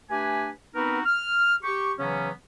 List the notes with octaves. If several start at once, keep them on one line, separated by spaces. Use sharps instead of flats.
A3 D4 G4 B4 G#5
B3 C4 D#4 F#4 A#4 B4
F6
G4 C#6
C#3 E3 F#3 B3 C#4